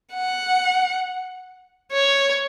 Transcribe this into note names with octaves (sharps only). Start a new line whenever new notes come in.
F#5
C#5